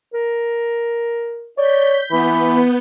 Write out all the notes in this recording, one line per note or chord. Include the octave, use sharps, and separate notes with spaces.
A#4
C#5 D5 G6 B6
E3 B3 B5